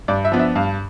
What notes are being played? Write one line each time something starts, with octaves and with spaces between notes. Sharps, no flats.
G2 D5
E5
F3 B3 D4
E5
G2 F5